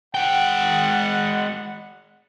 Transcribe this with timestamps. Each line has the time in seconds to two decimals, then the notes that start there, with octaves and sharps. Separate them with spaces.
0.14 G#3 F#5 G5